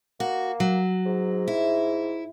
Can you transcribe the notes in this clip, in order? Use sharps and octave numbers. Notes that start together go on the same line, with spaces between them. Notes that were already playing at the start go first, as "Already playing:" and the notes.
A#3 F#4
F#3
G#2
E4